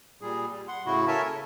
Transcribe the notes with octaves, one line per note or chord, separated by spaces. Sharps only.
A#2 G3 G#4
G3
F#5 C6
A2 C#3 E4 F#4
A4 A#4 C#5 E5 G#5 A5
C#3